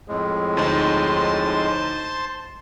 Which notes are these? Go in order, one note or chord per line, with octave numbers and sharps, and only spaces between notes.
F2 A2 G#3
D2 D#4 C5 A5 C6